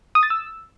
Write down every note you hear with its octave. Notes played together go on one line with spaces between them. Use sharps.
D#6
A6
E6